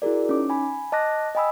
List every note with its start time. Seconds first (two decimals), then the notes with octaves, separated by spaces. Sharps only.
0.02 E4 F#4 G#4 A#4 D5
0.29 C#4 D#4 D6
0.50 G#5 B5
0.92 D#5 A5 D6 F#6 A#6
1.35 D#5 G5 G#5 B5 D#6 E6